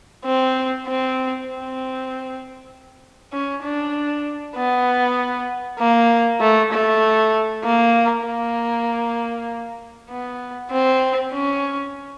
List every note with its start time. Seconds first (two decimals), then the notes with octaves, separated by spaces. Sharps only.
0.25 C4
0.86 C4
1.48 C4
3.32 C#4
3.63 D4
4.56 B3
5.79 A#3
6.40 A3
6.72 A3
7.64 A#3
8.25 A#3
10.10 B3
10.71 C4
11.33 C#4